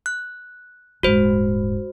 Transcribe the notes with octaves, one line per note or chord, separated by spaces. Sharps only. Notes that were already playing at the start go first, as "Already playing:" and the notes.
F#6
D#1 G#2 F#4 C5